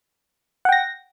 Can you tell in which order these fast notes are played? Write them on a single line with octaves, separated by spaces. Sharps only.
F#5 G5 A#6